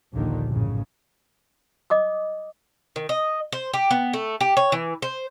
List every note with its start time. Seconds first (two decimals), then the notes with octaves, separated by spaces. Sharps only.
0.13 A#1 D#2 A#2 D3 D#3
0.47 A#1 F#2 A2 C#3
1.90 D#5 D6 D#6
2.96 D#3
3.09 D#5
3.53 C5
3.74 G4
3.91 B3
4.13 A3
4.41 G4
4.57 C#5
4.72 E3
5.02 C5